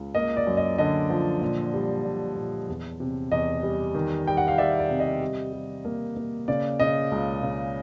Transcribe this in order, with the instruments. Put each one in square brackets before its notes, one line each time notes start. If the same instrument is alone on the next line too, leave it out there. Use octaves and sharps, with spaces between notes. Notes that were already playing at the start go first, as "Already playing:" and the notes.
Already playing: [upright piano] C#2
A#3 D#5
D5
F#2
D#5
D3 D#5
F3
A#2
G3
A#2
A#2
E2
C3
E2 D#5
G3
D#3
G3 G5
F#5
F5
G3 D5 E5
D5
C3
D#5
G3
G3
A#3
A#3
C#3 D5
C#3 D#5
C#2
C#3